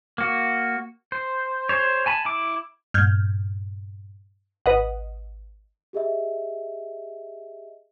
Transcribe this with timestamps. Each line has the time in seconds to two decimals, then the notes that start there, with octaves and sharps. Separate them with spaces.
0.18 A#3 F#4
1.12 C5
1.69 G#4 C5 C#5
2.06 G#5 A5 B5
2.25 E4 D6
2.94 G2 A#2 F6 G6 G#6
4.66 G#1 B4 D#5 F#5
5.93 G4 G#4 D#5 E5